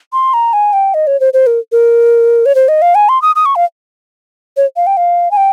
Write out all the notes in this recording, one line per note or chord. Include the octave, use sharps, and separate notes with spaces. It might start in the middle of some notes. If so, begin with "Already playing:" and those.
C6
A#5
G#5
G5
D#5
C#5
C5
C5
A#4
A#4
C#5
C5
D#5
F5
G#5
C6
D#6
D#6
C#6
F5
C#5
F5
G5
F5
G#5
G5